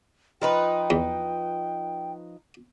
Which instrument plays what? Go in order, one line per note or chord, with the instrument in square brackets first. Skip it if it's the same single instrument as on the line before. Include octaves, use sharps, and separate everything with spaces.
[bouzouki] F3 D#4 B4 [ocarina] G5
[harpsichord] E2